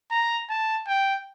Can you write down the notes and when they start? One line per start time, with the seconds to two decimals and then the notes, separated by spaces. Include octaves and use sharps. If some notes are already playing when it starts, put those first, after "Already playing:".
0.11 A#5
0.50 A5
0.88 G5